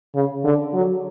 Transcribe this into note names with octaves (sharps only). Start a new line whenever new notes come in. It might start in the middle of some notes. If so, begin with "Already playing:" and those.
C#3
D3
F#3